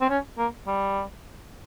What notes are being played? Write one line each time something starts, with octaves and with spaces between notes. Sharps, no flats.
C4
C#4
A#3
G3